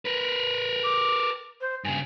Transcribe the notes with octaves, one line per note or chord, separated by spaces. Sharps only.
A#4 B4
D6
C5
G2 C#3 G#5